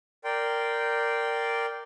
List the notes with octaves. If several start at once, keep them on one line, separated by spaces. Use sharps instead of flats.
A#4 D5 G5 C6